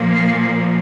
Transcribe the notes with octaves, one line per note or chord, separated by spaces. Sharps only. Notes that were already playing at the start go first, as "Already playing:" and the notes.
Already playing: A#2 F3 A#3
F5